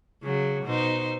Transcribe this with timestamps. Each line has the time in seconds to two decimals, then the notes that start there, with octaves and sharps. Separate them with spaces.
0.23 C#3 F#3
0.64 B2 D#4 C5